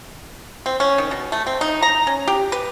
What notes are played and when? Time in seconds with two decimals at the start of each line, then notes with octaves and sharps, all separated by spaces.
0.66 C4
0.80 C#4
0.98 D#3
1.11 B2
1.32 A3
1.47 C4
1.61 D#4
1.82 A#5
2.07 C#4
2.28 G4
2.52 B4